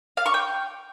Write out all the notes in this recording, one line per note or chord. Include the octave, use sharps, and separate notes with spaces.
F5
C#6
G5